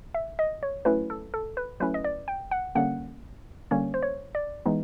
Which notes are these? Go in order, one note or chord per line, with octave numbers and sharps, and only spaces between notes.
E5
D#5
C#5
F#3 A3 C#4 E4 B4
A4
A4
B4
F#3 A3 C#4 E4 B4
D#5
D5
G5
F#5
D3 G3 A#3 C#4 F#5
D3 G3 A#3 C#4 C#5
C5
C#5
D5
E3 G#3 B3 D#4